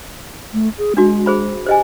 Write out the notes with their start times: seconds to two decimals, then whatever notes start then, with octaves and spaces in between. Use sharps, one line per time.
0.53 A3
0.78 G#4
0.97 G#3 D4 F#4
1.26 G#4 C5 B5
1.66 G4 C5 D#5 G#5